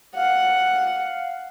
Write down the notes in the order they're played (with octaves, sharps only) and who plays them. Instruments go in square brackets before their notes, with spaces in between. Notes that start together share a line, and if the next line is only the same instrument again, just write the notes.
[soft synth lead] F5 [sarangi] F#5